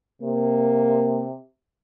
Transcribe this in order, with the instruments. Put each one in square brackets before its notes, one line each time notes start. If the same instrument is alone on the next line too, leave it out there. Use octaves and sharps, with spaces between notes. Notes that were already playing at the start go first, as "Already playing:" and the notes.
[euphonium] C3 [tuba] A#3